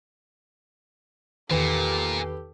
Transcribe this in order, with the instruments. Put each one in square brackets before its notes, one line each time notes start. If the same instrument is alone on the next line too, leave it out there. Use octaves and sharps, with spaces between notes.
[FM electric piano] E2 D#3 [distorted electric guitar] A#2 [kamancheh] G4 A4 [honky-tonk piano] B4